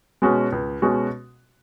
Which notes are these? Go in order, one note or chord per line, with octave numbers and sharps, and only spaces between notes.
B2 G#3 C#4 F#4
C#2
B2 G#3 C#4 F#4